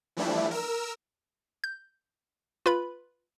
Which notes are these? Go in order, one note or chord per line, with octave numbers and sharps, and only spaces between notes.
E3 F3 G3 A3 D4 E4
A#4 E6
G6
F4 B4 B5